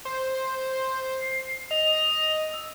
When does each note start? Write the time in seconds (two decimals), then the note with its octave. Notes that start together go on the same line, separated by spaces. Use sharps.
0.05 C5
1.21 C7
1.71 D#5 F7
2.53 E6